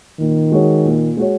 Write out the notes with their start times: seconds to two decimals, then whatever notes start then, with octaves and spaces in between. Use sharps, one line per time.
0.19 A#2 D#3
0.52 G#3 F#4 C#5
0.85 A#2
1.17 G#3 F#4 C#5